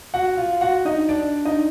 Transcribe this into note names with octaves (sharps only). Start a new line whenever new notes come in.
F#4 F#5
F4 F5
F#4 F#5
D#4 D#5
D4 D5
D#4 D#5